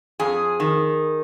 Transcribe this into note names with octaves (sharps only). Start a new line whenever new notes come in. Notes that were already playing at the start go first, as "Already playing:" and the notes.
F2 G#4
D#3